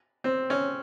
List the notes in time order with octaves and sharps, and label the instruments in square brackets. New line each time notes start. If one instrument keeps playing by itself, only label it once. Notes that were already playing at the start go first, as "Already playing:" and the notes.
[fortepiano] C4
C#4